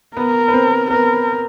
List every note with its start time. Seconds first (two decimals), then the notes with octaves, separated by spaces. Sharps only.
0.17 B3 A#4 B4
0.48 B4
0.53 C4 C5
0.90 B3 A#4 B4